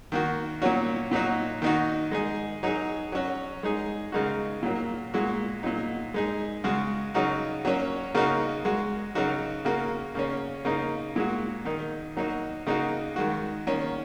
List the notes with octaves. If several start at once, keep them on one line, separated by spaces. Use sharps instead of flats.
D#3 A#3 F#4
A#2 F#3 C#4 F#4
A#2 F#3 D#4 F#4
D#3 A#3 D#4 F#4
G#3 D#4 G#4
F#3 D#4 G#4
F#3 C#4 F#4
G#3 D#4 G#4
C#3 G#3 D#4 F#4
A#2 F#3 A#3
A#2 G#3 F#4
A#2 F#3 D#4
G#3 D#4 G#4
C#3 G#3 F#4
C#3 F#3 D#4 F#4
F#3 A#3 C#4
C#3 A#3 D#4 F#4
G#3 F#4
C#3 F#3 D#4 F#4
C#3 A#3 F#4
C#3 A#3 C#4
C#3 A#3 D#4
A#2 G#3 F#4
D#3 A#3 D#4
F#3 A#3 D#4 F#4
C#3 A#3 D#4 F#4
D#3 G#3 F#4
D#3 A#3 C#4